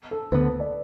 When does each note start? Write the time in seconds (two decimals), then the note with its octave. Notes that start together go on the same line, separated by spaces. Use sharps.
0.11 A4
0.32 D2 D3 B3 B4
0.60 D5